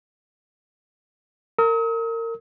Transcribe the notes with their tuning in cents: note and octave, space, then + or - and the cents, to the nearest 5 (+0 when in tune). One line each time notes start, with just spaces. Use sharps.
A#4 -30 D#6 +45